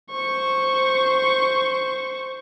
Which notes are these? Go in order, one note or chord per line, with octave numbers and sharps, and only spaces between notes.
C5 C#6